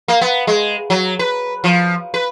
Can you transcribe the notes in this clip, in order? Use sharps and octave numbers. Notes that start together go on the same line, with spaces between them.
A#3
B3
G#3
F#3
B4
F3
B4